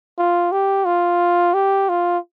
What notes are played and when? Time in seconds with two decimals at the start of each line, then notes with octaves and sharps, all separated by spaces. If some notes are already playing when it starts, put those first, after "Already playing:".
0.18 F4
0.52 G4
0.86 F4
1.54 G4
1.89 F4